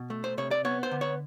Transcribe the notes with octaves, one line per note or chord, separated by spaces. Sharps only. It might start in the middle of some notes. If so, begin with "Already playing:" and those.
Already playing: B2
A3
C5
C3 C#5
D5
B3 C#5
C5
D3
C#5